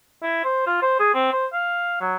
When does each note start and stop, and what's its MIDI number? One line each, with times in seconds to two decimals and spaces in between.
0.22 0.44 64
0.44 0.67 72
0.67 0.79 65
0.82 0.97 72
0.99 1.10 68
1.14 1.32 60
1.33 1.46 72
1.53 1.99 77
2.01 2.16 54